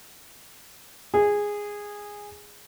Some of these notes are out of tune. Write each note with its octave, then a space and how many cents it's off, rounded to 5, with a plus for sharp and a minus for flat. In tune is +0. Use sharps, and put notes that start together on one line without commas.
G#4 -10